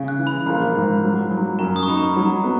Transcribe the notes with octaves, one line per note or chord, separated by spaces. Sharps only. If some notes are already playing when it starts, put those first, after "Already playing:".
Already playing: C#3
F#6
E3
B5
A#1
G#2
F#3
F#3
F#2 A#5
D#6
C#6
D#4 B5
A#5
F#3
B3